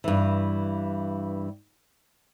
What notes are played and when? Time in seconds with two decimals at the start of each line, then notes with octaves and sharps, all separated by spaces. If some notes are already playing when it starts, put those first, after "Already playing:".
0.04 G2 E3